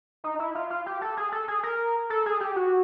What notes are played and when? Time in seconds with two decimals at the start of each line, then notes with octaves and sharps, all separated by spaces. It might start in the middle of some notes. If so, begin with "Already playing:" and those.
0.24 D#4
0.39 E4
0.55 F4
0.70 F4
0.86 G4
1.01 A4
1.17 G#4
1.32 A4
1.48 G#4
1.63 A#4
2.10 A4
2.26 G#4
2.40 G4
2.56 F#4